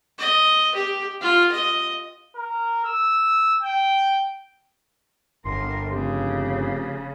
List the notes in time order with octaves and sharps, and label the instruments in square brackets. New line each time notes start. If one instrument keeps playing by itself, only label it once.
[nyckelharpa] D#5
G4
F4
D#5
[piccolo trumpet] A#4
E6
G5
[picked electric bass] G1 [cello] A#4 [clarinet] C6
[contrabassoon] F1 [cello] C#3 [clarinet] G4